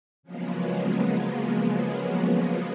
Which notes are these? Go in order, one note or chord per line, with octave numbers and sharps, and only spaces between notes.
C#3 F3 F#3 G#3 A#3 B3